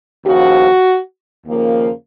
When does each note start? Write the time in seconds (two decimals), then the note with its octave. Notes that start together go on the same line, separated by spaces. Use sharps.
0.25 D#2 C#3 F3 F#4
1.46 D#2 C#3 F3 A#3